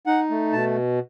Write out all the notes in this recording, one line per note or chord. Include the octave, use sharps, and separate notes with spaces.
D#4 F#5
A3
B2 A5